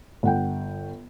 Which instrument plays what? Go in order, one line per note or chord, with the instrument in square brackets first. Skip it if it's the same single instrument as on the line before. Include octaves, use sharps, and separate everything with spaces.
[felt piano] G1 F#5 G5